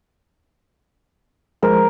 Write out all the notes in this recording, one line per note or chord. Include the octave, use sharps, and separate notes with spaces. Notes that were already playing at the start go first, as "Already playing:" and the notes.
F3 G#3 A#4 C5